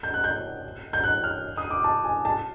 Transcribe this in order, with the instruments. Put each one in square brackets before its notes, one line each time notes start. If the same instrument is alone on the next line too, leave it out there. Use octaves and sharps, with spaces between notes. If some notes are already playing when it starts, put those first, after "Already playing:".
[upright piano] G6
F#6
G6
G6
F#6
F6
D#6
D6
A5
G#5
A5